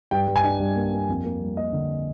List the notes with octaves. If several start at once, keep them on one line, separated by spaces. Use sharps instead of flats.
G2 G5
G2
G#5
D4
G2
A#3
A#3
F2
A#3
G3
A#3 D#5
D3